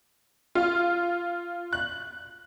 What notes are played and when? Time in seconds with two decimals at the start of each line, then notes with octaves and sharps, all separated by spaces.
0.55 F4
1.73 F#6